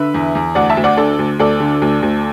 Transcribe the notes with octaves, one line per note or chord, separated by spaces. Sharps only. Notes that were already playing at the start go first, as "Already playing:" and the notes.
Already playing: D3 B4 E5
E2
E2
D2 D5 F#5
E5 A5
D2
D5 F#5
D3 A4 D5
D2
D2 A4 D5
D3
D2
D2